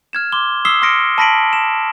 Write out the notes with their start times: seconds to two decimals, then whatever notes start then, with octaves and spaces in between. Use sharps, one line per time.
0.13 F6 G#6 E7
0.32 C6 D6 G7
0.65 D#6 E6 B6 C7 E7 G7
0.82 C6 D#6 F6 A#6 C#7 D7
1.18 A5 B5 A#6 B6 D7 F#7
1.53 E7